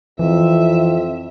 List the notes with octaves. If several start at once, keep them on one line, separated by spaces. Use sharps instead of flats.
F2 E3 E5